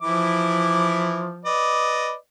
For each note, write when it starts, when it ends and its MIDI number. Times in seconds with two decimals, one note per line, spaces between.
0.02 1.33 52
0.02 1.51 53
0.02 1.33 64
0.02 1.33 86
1.45 2.14 71
1.45 2.14 74
1.45 2.14 75